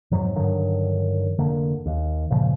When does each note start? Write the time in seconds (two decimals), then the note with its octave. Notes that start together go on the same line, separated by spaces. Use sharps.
0.11 F2 G#2 F#3
0.35 G2 D3 D#3 F#3
1.38 F1 D3 A#3
1.86 D#2
2.30 G1 A#2 C#3 F3